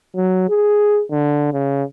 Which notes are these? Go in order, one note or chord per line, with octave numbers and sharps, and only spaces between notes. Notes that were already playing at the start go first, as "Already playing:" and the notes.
F#3
G#4
D3
C#3